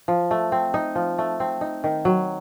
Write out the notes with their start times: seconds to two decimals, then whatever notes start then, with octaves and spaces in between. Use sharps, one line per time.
0.08 F3
0.31 A3
0.52 C4
0.74 D#4
0.95 F3
1.18 A3
1.40 C4
1.61 D#4
1.84 D#3
2.05 F#3